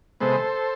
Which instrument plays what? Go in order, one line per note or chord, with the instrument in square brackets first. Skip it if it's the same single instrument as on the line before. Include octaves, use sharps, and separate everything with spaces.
[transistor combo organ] C3 G#3 B3 A4 C5